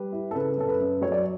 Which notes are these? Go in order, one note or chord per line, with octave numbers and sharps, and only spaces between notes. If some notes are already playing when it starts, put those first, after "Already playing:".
Already playing: G3 B4
E4
A4
C#3 B4
F#2 A4
B4
F#2
F#3 C#5
D5